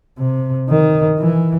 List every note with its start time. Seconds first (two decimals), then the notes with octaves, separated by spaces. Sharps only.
0.18 C3
0.69 D#3
1.20 E3